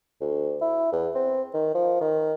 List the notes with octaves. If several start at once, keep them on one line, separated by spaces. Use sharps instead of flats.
D2
E4
E2
C4
D#3
F3
D#3